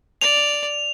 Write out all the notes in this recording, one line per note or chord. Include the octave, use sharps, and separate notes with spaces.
D5 F7